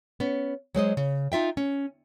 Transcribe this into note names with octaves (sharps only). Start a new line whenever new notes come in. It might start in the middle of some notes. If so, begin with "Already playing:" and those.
B3 C#4
F#3 G#3 C5 D#5
C#3
D#4 F4 E5 G5
C#4